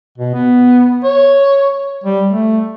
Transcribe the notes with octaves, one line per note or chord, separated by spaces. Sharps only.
B2
B3
C#5
G3
A3